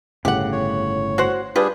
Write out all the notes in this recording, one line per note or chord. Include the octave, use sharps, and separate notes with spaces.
G1 A2 C#3 G4 F#5
C#5
F#4 C5 F#5
G3 D4 F4 G4 G#4 B4